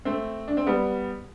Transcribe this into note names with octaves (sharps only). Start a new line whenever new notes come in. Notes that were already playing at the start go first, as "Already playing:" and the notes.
A3 C4
D4
C4
G3 B3